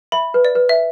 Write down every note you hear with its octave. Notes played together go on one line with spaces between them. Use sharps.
E5 B5
B4
D5
B4
E5